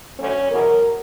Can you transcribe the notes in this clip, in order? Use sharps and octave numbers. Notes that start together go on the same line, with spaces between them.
D2 D3 F#3 C#4
E2 B2 F#3 A#4